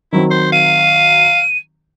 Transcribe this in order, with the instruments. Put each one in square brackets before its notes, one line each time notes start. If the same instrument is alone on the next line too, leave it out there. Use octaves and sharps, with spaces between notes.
[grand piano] D#3 F#3 C4 [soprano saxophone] E4
[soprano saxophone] C5
[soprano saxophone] F5 [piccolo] D#7